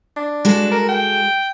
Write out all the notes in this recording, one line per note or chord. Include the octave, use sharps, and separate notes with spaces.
D4
G#3 F#4 A4
A#4
G5